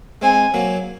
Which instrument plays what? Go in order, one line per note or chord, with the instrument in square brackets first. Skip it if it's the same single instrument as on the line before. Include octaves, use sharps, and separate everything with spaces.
[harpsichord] G#3 C4 [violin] G#5
[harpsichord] F#3 A#3